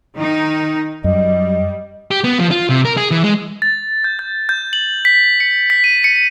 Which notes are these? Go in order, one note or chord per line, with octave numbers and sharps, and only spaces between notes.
D#3 D#4
F#2 G3 D#5
G4
B3
F3
F4
C3
A#4
G#4
E3
G#3
A6
G6
G6
G6
F#7
B6
C#7
B6
D#7
C#7